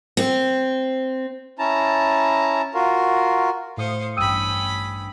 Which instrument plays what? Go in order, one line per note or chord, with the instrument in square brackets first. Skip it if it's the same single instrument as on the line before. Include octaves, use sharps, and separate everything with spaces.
[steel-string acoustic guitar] C4
[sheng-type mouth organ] C#4 E4 A5 A#5
F4 F#4 A#4
[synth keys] A2 D#6 C#7 [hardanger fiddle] C5 F5
[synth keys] A1 G2 G5 [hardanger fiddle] C#4 B5 [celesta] D#6 E6 D#7